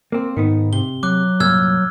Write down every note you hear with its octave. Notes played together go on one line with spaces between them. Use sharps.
A#3 C4
G#2 D#3 B3 D#4
C3 G7
F#3 D6 F#6
C2 G2 A#2 E6 F6 G#6